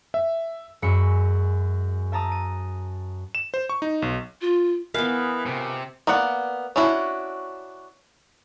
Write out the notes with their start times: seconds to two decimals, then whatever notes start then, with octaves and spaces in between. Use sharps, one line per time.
0.14 E5
0.82 F#2 G#3 E5 B5 C#6 C#7
2.12 E5 A5 A#5 D#6
2.32 D#7
3.35 E7
3.54 C5
3.70 C#6
3.82 D#4
4.02 B1
4.41 F4
4.94 E3 B3 A#4 E5 F5 G#5
5.46 C#2 C3
6.07 A#3 B3 D5 F#5
6.76 C#4 D4 E4 F#4